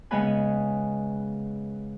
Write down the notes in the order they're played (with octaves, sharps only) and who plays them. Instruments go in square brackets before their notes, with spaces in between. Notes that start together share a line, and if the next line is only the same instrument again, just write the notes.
[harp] C#3 G#3 B3 C#4 B4 G#5